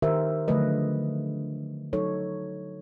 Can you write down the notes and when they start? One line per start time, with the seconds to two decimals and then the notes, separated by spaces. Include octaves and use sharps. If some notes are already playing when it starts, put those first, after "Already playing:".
0.02 D#3 G4 A#4 C5 E5
0.48 D3 F3 F#3 A3 B4 D#5
1.93 F#3 D#4 A4 C#5